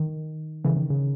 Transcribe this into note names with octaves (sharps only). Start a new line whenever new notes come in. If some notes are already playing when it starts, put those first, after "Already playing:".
Already playing: D#3
C#3 E3
D#3
C#3